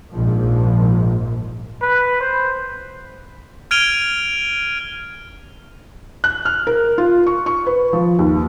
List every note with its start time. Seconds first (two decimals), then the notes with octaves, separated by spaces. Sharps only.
0.11 A#1 G#2 F3
1.82 B4
2.21 C5
3.71 F6 G#6 D7 D#7 F7 G7
6.24 F#6
6.45 F6
6.67 A#4
6.98 F4
7.27 C#6
7.46 C#6
7.67 B4
7.93 F3
8.19 D#2